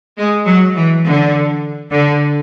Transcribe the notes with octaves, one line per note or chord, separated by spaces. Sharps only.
G#3
F#3
E3
D3
D3